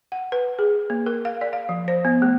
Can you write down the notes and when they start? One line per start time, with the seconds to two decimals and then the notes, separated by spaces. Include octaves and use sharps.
0.12 F#5
0.32 B4
0.59 G#4
0.90 A#3
1.06 A#4
1.25 F5
1.41 D5
1.53 F5
1.69 F3
1.88 C5
2.05 B3
2.22 A3